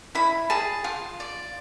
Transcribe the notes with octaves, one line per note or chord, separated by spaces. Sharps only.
E4 B5
G#4 A5
F4
D5